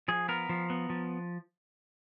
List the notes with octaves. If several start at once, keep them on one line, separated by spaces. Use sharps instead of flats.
F3 G#4
B3 A#4
F3
B3
F3